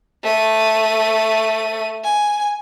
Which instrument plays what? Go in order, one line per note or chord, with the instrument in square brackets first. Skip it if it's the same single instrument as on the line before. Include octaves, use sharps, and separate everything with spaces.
[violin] A3 D#7
G#5